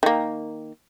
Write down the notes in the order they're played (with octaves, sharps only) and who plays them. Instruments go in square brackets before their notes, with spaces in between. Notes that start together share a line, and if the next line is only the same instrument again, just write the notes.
[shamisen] D#3 A#3